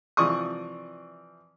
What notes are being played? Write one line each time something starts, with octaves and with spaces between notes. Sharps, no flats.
C3 E3 F3 D5 C#6 D#6